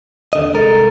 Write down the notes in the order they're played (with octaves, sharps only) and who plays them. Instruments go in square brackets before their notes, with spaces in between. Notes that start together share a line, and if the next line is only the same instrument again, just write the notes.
[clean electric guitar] D#2 D3 D#5
[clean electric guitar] C2 G#3 A#4 [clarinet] A4